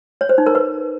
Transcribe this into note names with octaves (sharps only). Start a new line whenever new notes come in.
C#5
C5
D#4
A#4
B4